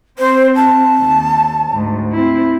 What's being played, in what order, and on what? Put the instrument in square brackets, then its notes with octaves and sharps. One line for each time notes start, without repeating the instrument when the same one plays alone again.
[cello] C4 [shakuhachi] C5
[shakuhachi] A5
[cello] D#2
D2 G#2
C4 E4